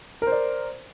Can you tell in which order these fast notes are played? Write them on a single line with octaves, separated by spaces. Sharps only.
A#4 C5 D5